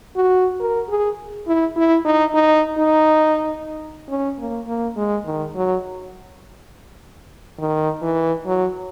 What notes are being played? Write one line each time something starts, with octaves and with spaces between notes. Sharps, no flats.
F#4
A#4
G#4
E4
E4
D#4
D#4
D#4
C#4
A#3
A#3
G#3
D#3
F#3
D#3
E3
F#3